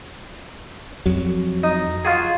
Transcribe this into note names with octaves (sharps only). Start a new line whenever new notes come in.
F2 F#3
D#4
F4 F#4 G#4